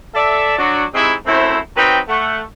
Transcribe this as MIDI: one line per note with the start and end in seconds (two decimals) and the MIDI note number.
0.15 0.57 69
0.15 0.57 74
0.15 0.57 76
0.58 0.84 54
0.58 0.84 62
0.58 0.84 66
0.94 1.15 44
0.94 1.15 48
0.94 1.15 56
0.94 1.15 60
0.94 1.15 64
1.27 1.58 42
1.27 1.58 57
1.27 1.58 60
1.27 1.58 64
1.27 1.58 72
1.27 1.58 83
1.76 1.99 54
1.76 1.99 60
1.76 1.99 63
1.76 1.99 71
1.76 1.99 79
2.09 2.41 57
2.09 2.41 78